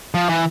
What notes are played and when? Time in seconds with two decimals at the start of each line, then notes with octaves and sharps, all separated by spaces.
0.14 F3
0.29 E3